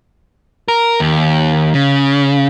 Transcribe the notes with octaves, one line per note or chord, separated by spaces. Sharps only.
A#4
D#2
C#3